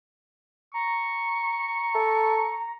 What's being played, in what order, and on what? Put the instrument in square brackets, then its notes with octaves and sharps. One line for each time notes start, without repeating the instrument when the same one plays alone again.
[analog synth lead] A#5 [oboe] C#6
[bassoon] A4